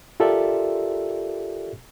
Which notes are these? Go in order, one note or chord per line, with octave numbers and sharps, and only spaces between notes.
F4 G4 A4 A#4 D5 E5